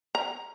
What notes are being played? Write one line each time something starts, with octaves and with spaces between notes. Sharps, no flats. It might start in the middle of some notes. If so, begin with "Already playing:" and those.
A#5